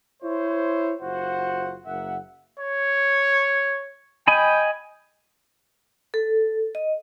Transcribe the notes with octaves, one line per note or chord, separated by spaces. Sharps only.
E4 C5 C#5
F#1 F4 F#4 C5 F#5
F#1 A#3 E5 F#5
C#5
D#5 G5 G#5 B5
A4
D#5